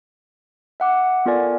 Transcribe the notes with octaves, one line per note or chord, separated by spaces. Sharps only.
E5 F#5 D6
B3 F4 A4 A#4 D5 G#5